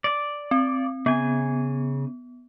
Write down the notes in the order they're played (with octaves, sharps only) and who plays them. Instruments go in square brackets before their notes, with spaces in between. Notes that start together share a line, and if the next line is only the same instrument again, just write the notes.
[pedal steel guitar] D5
[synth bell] C4
[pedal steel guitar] C#3 G#5 [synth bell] B3